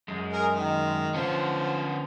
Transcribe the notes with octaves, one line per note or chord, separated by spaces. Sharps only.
F#2 G#3
G#4 A#4
D#3
D3 F3 B3 C#4 C5